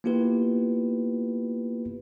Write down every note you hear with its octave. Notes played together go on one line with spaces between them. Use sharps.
A#3 B3 E4 F4 G4 B4